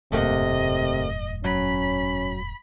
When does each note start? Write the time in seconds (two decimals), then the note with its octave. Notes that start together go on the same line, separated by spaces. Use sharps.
0.12 E1 F#2 A2 C3 A3 A#3 D#5 F#5
1.44 F#3 C#4 B5